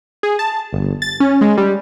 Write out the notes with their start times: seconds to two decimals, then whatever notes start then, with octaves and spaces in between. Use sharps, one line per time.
0.23 G#4
0.39 A5
0.73 G1
1.02 A6
1.20 C#4
1.41 G#3
1.58 G3